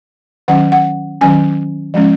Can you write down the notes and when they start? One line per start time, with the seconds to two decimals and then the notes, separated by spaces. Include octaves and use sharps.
0.48 D#3 F#3 C#4 F#5
0.72 F#5
1.21 D#3 F#3 C#4 G#5
1.94 F3 G#3 C#4